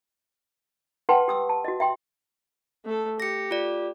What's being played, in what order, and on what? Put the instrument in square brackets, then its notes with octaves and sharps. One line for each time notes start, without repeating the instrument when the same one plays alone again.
[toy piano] B4 F#5 G5 A5 C6
G4 D#6 E6
A5
F#4 D#5
E5 G5 C6
[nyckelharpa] A3 A4
[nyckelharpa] G4 [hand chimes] A#6 C#7
[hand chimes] F4 D5